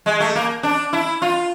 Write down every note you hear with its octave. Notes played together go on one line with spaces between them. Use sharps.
G#3
A3
A#3
D4
E4
F4